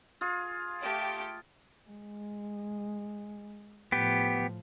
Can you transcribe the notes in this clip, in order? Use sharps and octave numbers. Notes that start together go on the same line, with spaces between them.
F4 G#4
A3 G4 D7
G#3
A2 F3 B3 G4